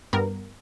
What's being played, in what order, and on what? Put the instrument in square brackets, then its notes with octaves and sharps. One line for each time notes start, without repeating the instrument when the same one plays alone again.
[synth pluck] G2 G3 B3 A#4